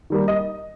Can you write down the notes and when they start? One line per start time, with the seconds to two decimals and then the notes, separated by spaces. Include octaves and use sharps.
0.10 D#3 G3 A#3
0.28 D#5